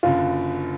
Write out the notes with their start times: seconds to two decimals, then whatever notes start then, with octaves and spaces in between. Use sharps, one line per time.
0.03 F#1 F#2 D3 F4